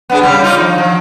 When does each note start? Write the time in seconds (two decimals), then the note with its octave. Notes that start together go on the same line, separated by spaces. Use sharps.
0.10 B3 D4 G#4
0.21 C#3 G3 G4
0.42 D#4 F4 D5
0.57 F3 D#4
0.78 F3